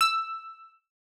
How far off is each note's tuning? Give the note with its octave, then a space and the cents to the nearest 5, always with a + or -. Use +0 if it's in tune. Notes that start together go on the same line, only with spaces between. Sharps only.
E6 +5